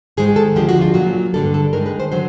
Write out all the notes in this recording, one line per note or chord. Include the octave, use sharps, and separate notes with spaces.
G#2 D#3 G#3 G#4
A4
D2 D3 F3 G#3 G4
F#4
F4
A#2 F#3 F#4
G2 D3 G3 A4
A4
G2 D#3 G#3 A#4
B4
C5
D3 F#3 C5